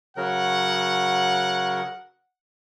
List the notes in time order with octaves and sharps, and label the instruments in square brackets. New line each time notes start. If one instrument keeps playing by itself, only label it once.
[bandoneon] C#3 F#3 A#4 [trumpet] F#5